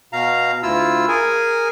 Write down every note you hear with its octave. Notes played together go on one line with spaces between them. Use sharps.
B2 F5 A#5
D2 E4 F4 E6
G#4 A#4 G#5